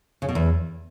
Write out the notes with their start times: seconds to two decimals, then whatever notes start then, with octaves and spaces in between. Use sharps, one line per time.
0.22 C#3
0.29 B2
0.35 E2